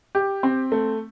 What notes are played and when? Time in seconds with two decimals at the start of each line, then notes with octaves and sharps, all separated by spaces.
0.15 G4
0.43 C4
0.72 A3